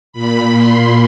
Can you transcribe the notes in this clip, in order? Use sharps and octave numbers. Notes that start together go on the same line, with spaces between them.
A#2 B5
C6